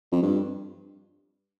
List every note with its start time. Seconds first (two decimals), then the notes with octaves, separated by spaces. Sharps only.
0.12 F2
0.22 G2